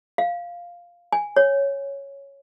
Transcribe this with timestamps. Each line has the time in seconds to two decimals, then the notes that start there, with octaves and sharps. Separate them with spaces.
0.18 F5
1.12 G#5
1.36 C#5